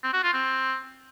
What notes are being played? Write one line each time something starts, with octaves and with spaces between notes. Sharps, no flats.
C4
F#4
F4
C4